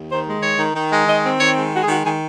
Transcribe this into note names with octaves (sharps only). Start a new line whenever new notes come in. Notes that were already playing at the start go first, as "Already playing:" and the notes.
Already playing: D#2
D#3 C5
G#3
D#3 C#5
D#3
D#3
G#3
D#3 D#5
C4
D#3 C#5
G#3
G#3 F#4
G#4
D#3 F#4
D#3 G#4